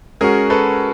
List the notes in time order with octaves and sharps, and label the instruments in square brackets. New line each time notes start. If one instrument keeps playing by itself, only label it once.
[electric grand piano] G#3 C#4 F#4 [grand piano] G#4 A#4
[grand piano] A4 B4